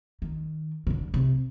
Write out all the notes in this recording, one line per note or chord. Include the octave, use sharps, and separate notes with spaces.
D#3
C#3
D3
C3